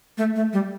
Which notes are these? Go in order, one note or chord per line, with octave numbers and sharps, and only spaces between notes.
A3
A3
G3